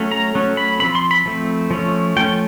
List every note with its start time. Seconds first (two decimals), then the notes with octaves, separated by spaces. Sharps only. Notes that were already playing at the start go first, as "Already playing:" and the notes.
Already playing: F#3 A3 C#4
0.11 A#5
0.35 F#3 A3 C#4
0.57 B5
0.80 F3 A3 C4 B5
0.95 C6
1.11 B5
1.26 F3 A3 C4
1.71 F3 A3 C#4
2.16 F3 A3 C#4 G5